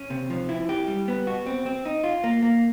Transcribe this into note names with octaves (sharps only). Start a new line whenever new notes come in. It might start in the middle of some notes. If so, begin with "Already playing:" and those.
Already playing: C#4
C3
F3
E4
G4
G3
B3
F#4
C4
C4
D#4
F4
A#3
A#3